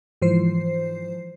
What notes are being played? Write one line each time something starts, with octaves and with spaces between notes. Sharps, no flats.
G#2 E3 F3 C5 C7